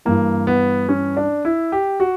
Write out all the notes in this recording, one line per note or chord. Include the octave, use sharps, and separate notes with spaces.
G2 E3 A#3
B3
C#4
D4
E4
G4
F#4